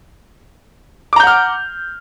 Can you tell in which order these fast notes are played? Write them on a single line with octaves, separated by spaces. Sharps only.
D6 A#5 G6 F#5 F6